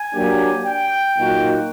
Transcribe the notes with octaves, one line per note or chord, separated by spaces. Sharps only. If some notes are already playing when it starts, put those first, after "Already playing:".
Already playing: G#5
F#3 A#3 D4 G4
G5
A#2 F#3 A#3 D#4 F#4